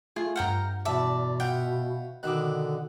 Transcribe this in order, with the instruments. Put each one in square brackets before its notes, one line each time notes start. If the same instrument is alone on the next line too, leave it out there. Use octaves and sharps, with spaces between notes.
[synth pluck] A3 F4 [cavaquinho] G#4
[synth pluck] G2 F6 [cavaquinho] F#5 G5 A#5
[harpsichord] E2 [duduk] B2 [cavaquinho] D5 E5 A5
[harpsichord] F4 E5 F#5 [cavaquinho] G5
[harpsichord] B2 D#3 [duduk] D3 [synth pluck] D6 E6 F#6